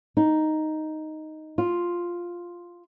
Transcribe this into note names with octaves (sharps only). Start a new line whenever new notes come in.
D#4
F4